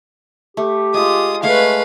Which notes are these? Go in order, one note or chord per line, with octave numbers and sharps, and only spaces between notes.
A3 G4
G#3 F4 D#6
G#3 A3 B4 C#5 F5